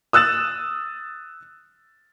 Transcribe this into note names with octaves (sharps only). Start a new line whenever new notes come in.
D#6 E6 F#6 A6 E7